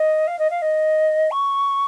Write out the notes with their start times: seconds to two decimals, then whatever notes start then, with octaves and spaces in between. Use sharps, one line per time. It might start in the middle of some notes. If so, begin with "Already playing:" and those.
Already playing: D#5
0.27 F5
0.38 D#5
0.50 F5
0.61 D#5
1.31 C#6